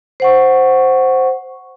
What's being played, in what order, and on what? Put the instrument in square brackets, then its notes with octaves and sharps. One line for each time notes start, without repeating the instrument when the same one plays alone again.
[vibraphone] C5 F#5 C#6